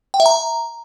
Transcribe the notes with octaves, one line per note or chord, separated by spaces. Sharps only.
G5
E5
A#5